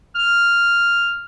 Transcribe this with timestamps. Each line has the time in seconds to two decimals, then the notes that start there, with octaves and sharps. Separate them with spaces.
0.15 F6